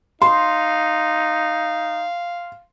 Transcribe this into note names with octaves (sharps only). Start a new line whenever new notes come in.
D#4 F5 C6